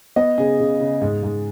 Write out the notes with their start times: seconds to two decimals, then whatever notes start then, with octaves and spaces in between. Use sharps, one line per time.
0.16 B3 D#5
0.38 C#3 G#4
0.60 C#3
0.80 C#3
1.02 G#2
1.23 G#2